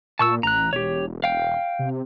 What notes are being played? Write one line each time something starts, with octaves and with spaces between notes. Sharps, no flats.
A#2 A5 C#6 E6
A1 A#5 F#6
E1 G4 C#5
F5 G5
C3